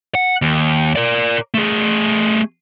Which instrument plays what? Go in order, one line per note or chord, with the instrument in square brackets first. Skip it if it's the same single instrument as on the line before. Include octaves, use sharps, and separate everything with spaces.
[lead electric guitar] F#5
D#2
A#4 D5
A3 G#4